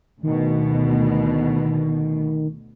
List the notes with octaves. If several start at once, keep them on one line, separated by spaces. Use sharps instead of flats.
D2 B2 D#3